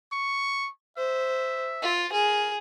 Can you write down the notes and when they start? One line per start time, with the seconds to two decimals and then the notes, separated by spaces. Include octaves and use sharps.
0.12 C#6
0.97 C5 E5
1.82 F4
2.13 G#4 A#4